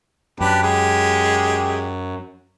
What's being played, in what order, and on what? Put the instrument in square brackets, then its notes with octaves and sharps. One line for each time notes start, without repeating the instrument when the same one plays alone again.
[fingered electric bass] F#2 [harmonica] D4 G4 B4
[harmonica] G#3 G4